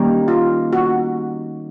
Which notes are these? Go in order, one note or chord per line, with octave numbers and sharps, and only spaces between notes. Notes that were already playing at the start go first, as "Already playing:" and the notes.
Already playing: D#3 G3 A#3 C#4 G4
F4
F#4